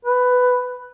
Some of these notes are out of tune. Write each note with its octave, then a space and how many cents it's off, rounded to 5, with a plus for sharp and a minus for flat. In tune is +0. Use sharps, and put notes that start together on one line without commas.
B4 +10